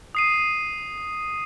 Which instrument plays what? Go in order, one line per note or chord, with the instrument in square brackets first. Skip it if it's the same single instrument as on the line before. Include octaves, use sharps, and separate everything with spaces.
[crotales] D#6 C7 D#7